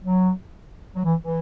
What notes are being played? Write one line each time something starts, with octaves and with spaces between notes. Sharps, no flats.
F#3
F#3
E3
E3